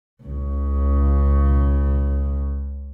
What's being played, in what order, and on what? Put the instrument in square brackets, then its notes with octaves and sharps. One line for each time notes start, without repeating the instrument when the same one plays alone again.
[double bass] C#2 C#3